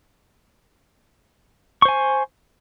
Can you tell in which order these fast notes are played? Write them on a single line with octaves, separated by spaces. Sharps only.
C#6 C5 G#5